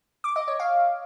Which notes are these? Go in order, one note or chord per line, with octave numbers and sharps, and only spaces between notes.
D6
D#5
C#5
F5